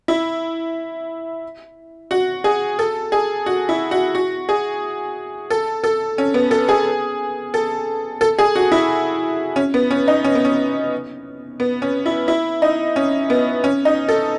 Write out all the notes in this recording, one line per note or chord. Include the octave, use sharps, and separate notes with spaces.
E4
F#4
G#4
A4
G#4
F#4
E4
F#4
F#4
G#4
A4
A4
C#4
B3
A4
G#4
A4
A4
G#4
F#4
E4
C#4
B3
C#4
D#4
C#4
B3
C#4
B3
C#4
E4
E4
D#4
C#4
B3
C#4
D#4
A4